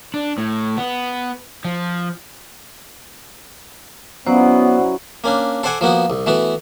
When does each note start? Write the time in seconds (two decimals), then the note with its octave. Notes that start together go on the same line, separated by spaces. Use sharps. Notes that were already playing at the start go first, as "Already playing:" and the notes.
0.14 D4
0.38 A2
0.77 B3
1.65 F3
4.26 F#3 B3 C#4 E4 C5 D5 F#5
5.24 A#3 C#4 D4
5.63 A4 C5 D5 F#5 G#5
5.81 F3 A#3 B3 F#4
6.10 C2
6.26 E3 A3 B3 F#4